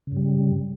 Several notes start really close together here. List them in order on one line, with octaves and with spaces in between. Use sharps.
C#3 G2 G3